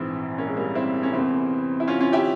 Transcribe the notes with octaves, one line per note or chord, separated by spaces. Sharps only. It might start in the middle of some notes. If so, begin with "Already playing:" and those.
Already playing: A#1 G#2 E3 C4 E4
A#3 C#4
G#3
G3 A#3
C4 E4
C#4
E2 C3 E3 C4 E4
E4
C#4 F4
C#4 F4
E4 G4